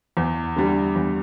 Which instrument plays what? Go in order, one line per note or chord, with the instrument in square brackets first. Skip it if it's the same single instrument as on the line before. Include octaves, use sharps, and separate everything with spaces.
[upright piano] E2
D3 G3
E2